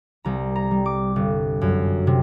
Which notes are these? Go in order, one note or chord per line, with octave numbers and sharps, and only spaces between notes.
C2 A#5
A#5
G3
D6
G1
F#2
C3